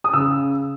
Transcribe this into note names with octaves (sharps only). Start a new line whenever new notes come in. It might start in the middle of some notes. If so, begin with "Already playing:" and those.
D#6
C#3 E6